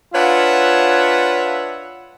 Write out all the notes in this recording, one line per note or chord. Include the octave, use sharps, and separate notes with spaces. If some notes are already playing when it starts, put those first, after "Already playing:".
D4 F4 B4 C#5 E5 F#5